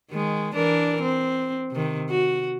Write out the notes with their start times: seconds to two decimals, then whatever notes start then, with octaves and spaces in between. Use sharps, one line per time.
0.11 D#3 G#3
0.55 E3 D4 A#4
1.01 C4
1.72 C3 D#3
2.10 F#4